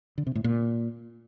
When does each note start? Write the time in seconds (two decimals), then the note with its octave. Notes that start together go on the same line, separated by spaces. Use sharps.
0.18 D3
0.27 C3
0.35 A2
0.44 A#2